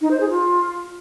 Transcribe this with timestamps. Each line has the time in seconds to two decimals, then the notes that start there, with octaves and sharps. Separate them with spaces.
0.01 D#4
0.11 C5
0.20 G#4
0.30 F4